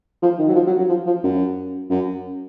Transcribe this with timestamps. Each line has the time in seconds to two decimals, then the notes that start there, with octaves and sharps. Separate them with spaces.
0.22 F3
0.39 D#3
0.49 F#3
0.55 F3
0.67 F#3
0.78 F#3
0.89 F3
1.06 F3
1.24 F#2
1.90 F#2